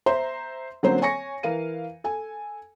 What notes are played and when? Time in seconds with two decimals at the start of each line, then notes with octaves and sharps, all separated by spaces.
0.06 C5 E5 A#5 C6
0.83 D3 F#3 A#3 C4 C#4 C5
1.01 C#5 G#5 C#6 A#6 C#7
1.43 E3 A#4 F5 D#7
2.04 A4 G#5